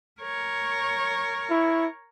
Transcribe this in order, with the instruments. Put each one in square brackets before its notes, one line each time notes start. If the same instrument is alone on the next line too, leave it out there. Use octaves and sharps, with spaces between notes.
[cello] A#4 C#5
[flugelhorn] E4